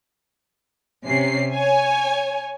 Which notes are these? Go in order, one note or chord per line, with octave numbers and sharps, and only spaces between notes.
C3 C#4 C7
C#5 G#5